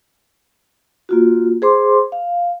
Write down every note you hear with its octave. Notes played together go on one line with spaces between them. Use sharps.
A#3 F4 F#4
G#4 C5 C6 D6
F5